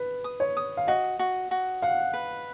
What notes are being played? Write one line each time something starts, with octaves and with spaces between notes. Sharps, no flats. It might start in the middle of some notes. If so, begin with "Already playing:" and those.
Already playing: B4
D#6
C#5
D#6
F5
F#4 D#5
F#4
F#4
F5 F#5
B4